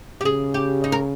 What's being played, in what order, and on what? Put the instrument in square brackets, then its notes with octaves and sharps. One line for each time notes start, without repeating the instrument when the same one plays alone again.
[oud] G4
[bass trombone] C#3 [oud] G#4
[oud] G4
D#4
A#4